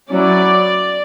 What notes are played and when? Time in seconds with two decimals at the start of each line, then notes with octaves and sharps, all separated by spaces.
0.10 F#3 C#4 E4 D5